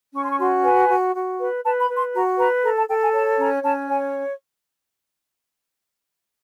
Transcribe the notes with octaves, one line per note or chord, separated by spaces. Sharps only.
C#4 C#6
C6
C#6
F#4 C6
B4 G#5
F#4
F#4
B4
B4 A5
B5
B4
C6
F#4 A#5
B4 A#5
A4 A#5
A5
A4 G5
G#5
C#5 A5
C#4 A#5
C#4 A5
C#5 G#5